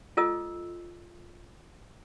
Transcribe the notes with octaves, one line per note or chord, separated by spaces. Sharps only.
F4 A4 D#5 E6